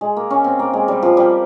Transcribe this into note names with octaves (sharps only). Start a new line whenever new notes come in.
G#3
A#3
C#4
C4
A#3
G#3
G3
F3
G3